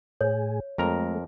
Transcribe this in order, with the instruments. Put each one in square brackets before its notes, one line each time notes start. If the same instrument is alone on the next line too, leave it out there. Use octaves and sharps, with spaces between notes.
[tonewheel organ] A2 G#4 [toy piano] C#5
[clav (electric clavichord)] F2 A#4 A#5 [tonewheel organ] G#3 A3